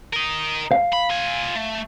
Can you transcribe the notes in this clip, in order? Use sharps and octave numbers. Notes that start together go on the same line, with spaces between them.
A#4 D#5
F5
B5
F4 G#5
A3